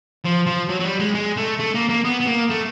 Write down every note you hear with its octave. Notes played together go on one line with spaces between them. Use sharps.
F3
F3
F#3
F#3
G3
G#3
G#3
A3
A3
A#3
A#3
B3
B3
A#3
A3